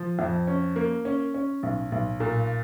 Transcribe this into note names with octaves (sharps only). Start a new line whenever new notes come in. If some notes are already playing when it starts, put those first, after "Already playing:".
Already playing: F3
F2
C#4
A#3
C#4
C#4
B1
B1
A#2